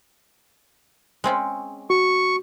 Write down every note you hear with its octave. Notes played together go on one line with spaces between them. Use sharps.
G#3 C4 C#4
F#4 C#6